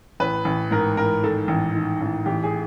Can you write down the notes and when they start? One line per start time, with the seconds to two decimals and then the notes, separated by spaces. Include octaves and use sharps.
0.20 A1 B4
0.45 A1
0.71 G#2 A#4
0.97 A1 A#4
1.24 D#3 A4
1.48 A1
1.75 D#3
2.01 A1
2.26 A1 G4
2.43 G#4